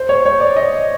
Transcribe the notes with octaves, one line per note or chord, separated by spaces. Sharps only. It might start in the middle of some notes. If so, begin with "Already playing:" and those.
Already playing: C5
C#5
C#5
D5
D#5